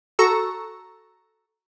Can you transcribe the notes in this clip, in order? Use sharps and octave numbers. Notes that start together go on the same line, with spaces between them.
F#4 A4 A#5 C#6 E6